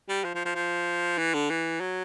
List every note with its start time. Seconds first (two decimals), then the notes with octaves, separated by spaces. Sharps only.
0.09 G3
0.24 F3
0.35 F3
0.45 F3
0.55 F3
1.18 E3
1.34 D3
1.50 E3
1.80 F#3